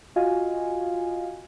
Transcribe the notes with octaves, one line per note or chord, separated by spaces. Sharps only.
F4 F#4 D#5 F5 G#5